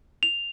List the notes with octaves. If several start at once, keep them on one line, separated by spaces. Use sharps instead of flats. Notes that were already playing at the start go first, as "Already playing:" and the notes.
F7